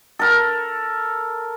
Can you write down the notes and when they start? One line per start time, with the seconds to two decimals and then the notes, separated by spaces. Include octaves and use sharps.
0.19 A4 A#4